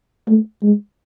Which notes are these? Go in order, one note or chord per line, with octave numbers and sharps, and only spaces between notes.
A3
G#3